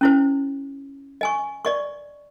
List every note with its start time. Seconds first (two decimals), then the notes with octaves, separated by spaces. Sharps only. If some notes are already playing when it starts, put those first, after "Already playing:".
0.01 C#4 E4 C5
1.21 D#5 G#5 C#6
1.65 D5 D#5 C#6